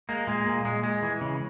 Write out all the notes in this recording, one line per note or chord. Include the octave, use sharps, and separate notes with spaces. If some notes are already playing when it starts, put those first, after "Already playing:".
G#3 A#3
A#2 G#3
A#2
G#3
G#3
E3
C#3